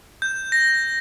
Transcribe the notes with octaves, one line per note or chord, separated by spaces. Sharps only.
G6
A#6